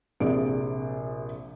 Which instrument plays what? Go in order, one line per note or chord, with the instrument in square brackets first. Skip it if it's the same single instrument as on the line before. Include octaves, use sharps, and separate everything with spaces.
[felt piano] A#1 C3 G#4 D5 D7